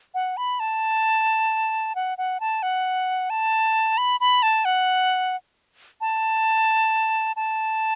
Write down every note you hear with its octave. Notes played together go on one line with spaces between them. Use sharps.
F#5
B5
A5
F#5
F#5
A5
F#5
A5
B5
B5
A5
F#5
A5
A5